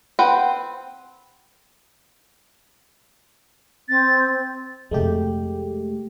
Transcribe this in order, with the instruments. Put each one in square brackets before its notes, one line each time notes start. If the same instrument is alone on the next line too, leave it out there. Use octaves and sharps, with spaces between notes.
[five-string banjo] C4 B4 F#5 G5
[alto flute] C4 [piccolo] A6
[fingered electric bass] F2 C3 [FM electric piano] G#3 A3 G4